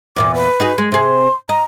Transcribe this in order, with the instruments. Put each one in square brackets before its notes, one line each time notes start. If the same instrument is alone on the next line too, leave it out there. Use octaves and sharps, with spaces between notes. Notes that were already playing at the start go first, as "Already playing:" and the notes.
[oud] E2 A#2 B3 [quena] D6
[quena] B4
[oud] D#4 F#4 G#4
G#3
[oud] C3 G#4 [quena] C6
[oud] D#5 [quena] A#5